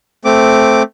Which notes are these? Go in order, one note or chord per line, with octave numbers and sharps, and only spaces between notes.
A3 C4 D6